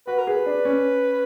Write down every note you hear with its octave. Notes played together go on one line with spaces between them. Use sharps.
F#4 B4
A#4
G#4 B4
D4
C#4